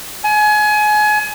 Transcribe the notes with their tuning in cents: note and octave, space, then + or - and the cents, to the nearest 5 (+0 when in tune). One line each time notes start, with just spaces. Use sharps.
G#5 +30